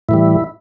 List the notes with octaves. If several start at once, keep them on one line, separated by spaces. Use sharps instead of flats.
A2 E3 G3 E4